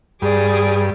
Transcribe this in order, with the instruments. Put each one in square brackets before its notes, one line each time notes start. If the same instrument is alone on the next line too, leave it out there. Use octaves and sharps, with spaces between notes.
[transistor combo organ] G2 [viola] G#4 D5